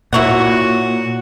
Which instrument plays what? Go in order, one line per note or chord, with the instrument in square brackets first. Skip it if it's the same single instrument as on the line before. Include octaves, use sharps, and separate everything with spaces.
[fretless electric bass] A#2 [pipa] E4 C#5 F#5 [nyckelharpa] F#4